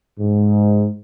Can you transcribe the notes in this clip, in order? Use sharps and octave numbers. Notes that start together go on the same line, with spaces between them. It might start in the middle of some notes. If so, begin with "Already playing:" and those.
G#2